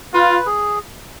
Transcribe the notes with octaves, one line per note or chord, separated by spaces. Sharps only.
F4 B4
G#4